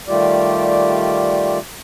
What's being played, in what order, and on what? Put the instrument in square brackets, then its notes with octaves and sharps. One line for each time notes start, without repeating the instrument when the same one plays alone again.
[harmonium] D#3 G3 A3 F4 G4 D5